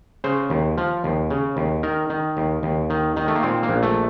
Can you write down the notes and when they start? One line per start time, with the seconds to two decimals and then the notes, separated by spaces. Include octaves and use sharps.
0.24 C#3 C5
0.50 D#2
0.78 F3
1.04 D#2
1.30 C#3
1.57 D#2
1.83 D#3 A#4
2.10 D#3
2.37 D#2
2.63 D#2
2.90 D#3
3.17 D#3
3.28 A3
3.35 A#3
3.43 A#2 C4
3.63 A#3
3.69 A#1
3.83 A3